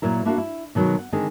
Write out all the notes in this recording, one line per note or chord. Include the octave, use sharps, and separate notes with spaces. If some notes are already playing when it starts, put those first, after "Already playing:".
A#2 F#3 E4 A#4
A#3 D4 E4 F#4 A#4 F5
E4
B2 D#3 F#3 G#3
F#5
D3 D#3 G#3 C4 G#4